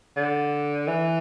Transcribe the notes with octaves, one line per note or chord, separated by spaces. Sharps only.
D3
E3